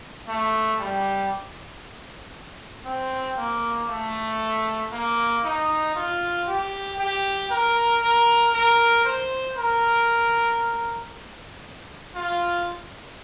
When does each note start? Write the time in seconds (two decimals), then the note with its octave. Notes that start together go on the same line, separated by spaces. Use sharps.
0.27 A3
0.79 G3
2.85 C4
3.37 A#3
3.89 A3
4.92 A#3
5.44 D#4
5.95 F4
6.47 G4
6.99 G4
7.50 A#4
8.02 A#4
8.54 A#4
9.05 C5
9.57 A#4
12.15 F4